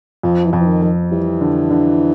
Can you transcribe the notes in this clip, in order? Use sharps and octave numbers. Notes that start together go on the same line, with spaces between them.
F2 F3
E3
F2 F3
E3
D#3
F2
E3 G3
D3
D3